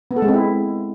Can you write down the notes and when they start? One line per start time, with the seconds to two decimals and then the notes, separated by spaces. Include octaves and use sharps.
0.11 B3
0.16 A4
0.22 G#3
0.28 C4
0.34 E4